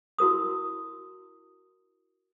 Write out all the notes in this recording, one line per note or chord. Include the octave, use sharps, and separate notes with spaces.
E4 F#4 A#4 D#6